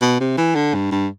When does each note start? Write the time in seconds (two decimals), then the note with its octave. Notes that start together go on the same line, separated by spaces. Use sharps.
0.02 B2
0.20 C3
0.38 E3
0.55 D3
0.74 G2
0.92 G2